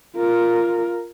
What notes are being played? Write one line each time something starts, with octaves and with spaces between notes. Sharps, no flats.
F4 A#4